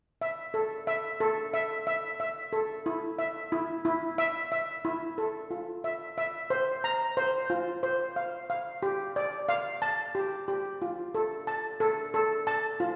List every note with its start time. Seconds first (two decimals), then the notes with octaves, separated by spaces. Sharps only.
0.22 E5
0.54 A4
0.87 E5
1.20 A4
1.54 E5
1.87 E5
2.20 E5
2.53 A4
2.86 E4
3.19 E5
3.52 E4
3.85 E4
4.18 E5
4.52 E5
4.85 E4
5.18 A4
5.51 F4
5.84 E5
6.18 E5
6.50 C5
6.84 A#5
7.17 C5
7.50 F4
7.83 C5
8.16 F5
8.50 F5
8.83 G4
9.16 D5
9.49 F5
9.82 A5
10.15 G4
10.48 G4
10.82 F4
11.15 A4
11.47 A5
11.80 A4
12.14 A4
12.47 A5
12.80 F4